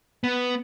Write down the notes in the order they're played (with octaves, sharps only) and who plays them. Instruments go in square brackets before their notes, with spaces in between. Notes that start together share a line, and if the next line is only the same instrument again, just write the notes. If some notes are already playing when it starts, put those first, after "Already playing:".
[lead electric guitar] B3